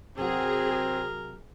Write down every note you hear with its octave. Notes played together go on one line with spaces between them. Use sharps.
C3 F#3 C4 F#4 G#4 A#4